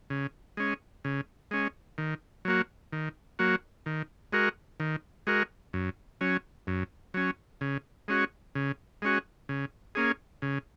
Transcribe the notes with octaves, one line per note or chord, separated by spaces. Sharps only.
C#3
G#3 C#4
C#3
G#3 C#4
D#3
F#3 A#3 F#4
D#3
F#3 A#3 F#4
D#3
G#3 F#4 A#4
D#3
G#3 F#4 A#4
F#2
F#3 C#4
F#2
F#3 C#4
C#3
G#3 C#4 F#4
C#3
G#3 C#4 F#4
C#3
A#3 C#4 G#4
C#3